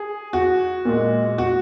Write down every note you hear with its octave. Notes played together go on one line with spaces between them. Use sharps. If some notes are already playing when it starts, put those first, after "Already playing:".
Already playing: G#4
F#4
A#2 G#3
F#4